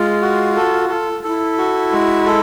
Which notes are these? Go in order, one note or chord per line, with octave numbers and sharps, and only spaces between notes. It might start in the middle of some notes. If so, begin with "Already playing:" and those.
Already playing: G#3 F4
F#4
A4
A4
E4 A4
F#4
G#3
A4